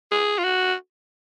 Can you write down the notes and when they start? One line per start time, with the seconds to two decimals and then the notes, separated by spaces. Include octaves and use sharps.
0.11 G#4
0.38 F4
0.44 F#4